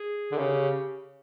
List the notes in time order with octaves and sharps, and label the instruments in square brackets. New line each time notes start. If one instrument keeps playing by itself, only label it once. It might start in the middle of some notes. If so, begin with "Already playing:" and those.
Already playing: [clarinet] G#4
[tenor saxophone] D3
[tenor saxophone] C#3 [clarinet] G4